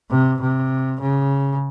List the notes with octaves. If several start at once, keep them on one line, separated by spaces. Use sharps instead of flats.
C3
C3
C#3